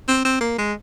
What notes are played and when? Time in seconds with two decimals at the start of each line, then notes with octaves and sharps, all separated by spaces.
0.08 C4
0.25 C4
0.41 A#3
0.58 G#3